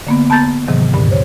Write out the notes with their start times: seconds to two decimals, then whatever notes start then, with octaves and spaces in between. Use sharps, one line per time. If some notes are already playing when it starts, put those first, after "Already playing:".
0.07 D3 A#3 B3
0.30 B3 A5 A#5 G6 A6
0.68 G#2 C3 D#3 E3 F#3
0.94 D2 G2 A#2 D3
1.11 C5 C#5